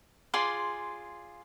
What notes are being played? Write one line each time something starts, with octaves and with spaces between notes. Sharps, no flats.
F4 G#4 D5 C6